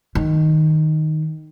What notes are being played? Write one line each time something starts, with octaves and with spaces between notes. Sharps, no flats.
D#3